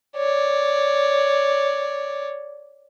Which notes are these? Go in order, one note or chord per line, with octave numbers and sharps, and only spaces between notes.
C#5 D5